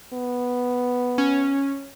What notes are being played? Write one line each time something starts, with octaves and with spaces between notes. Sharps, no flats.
B3
C#4